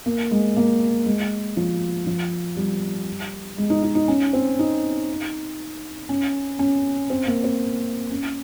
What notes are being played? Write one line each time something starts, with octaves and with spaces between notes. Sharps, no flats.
A#3
G#3
A#3
G#3
F3
F3
G3
G#3
D#4
D#4
D#4
C#4
C4
D#4
C#4
C#4
C4
A#3
C4
C#4